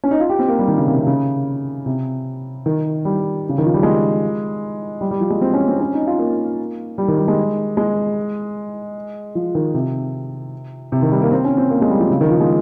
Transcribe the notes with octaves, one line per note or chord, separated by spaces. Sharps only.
C#4
D#4
F4
G4
C4
A#3
G3
D#3
C#3
C3
C3
C#3
C3
D#3
G3
C#3
D#3
F3
G3
G#3
G3
G3
F3
G#3
C4
C#4
C4
C#4
D#4
F4
A#3
G3
D#3
G3
G#3
G#3
F3
D#3
C3
C3
D#3
G3
A#3
C4
C#4
C4
A#3
G#3
G3
F3
C#3
D#3
F3
G#3